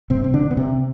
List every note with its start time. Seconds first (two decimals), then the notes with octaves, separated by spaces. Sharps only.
0.10 G2 C3 C4
0.24 C4
0.34 D3 D4
0.46 D3
0.51 B3
0.57 C3 C4